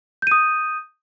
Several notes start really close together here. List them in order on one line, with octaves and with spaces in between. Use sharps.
G6 D#7 D#6